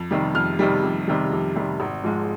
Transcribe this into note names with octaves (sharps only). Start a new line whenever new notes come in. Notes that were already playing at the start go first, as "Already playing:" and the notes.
Already playing: F2
C3 D#3 G3
F2 F6
C3 D#3 G3
F2
C3 D#3 G3
F2
C3 D#3 G3
G#1
G#2 F3 G#3